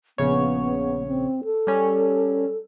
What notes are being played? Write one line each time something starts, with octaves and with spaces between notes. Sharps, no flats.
A#1 C#3 B3 C#5
C4
A4
G3 C#4